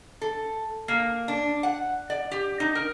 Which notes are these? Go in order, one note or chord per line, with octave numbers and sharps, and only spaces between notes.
A4
A#3
D4
F#5
D5
G4
D#4
A#4